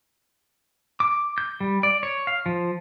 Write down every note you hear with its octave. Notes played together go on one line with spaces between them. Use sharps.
D6
G6
G3
D5
C#5
F5
F3